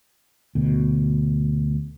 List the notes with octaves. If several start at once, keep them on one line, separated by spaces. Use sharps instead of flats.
D2 B2